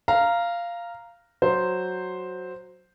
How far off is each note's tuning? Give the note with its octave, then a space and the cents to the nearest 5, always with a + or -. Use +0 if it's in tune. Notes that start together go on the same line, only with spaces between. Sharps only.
F5 -10 A#5 +0
F#3 +0 C5 +0